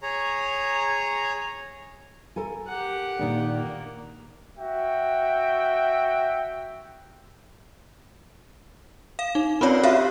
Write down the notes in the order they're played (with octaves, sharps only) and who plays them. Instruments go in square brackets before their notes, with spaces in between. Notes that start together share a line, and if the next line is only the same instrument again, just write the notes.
[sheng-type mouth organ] G#4 C#5 A#5
[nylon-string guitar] A4 A#4 G#5
[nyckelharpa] G4 F#5
[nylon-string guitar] A#2 D#3 D4
[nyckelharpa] A#3
[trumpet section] F#4 E5 G5
[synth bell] F5
D#4
C4 C#4 F4 C#5 D5
F#4 G4 C#5 E5 F5